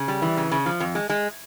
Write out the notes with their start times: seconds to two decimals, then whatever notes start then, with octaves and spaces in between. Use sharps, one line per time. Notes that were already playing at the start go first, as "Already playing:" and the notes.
Already playing: C#3
0.08 G3
0.22 E3
0.37 C#3
0.51 C#3
0.66 F3
0.80 F2
0.95 G#3
1.09 G#3